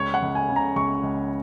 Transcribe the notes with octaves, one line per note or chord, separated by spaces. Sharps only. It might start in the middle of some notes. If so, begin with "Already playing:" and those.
Already playing: C#2 C#5
F#5
C#2
G#5
C#3
A#5
C#2 C#6
C#2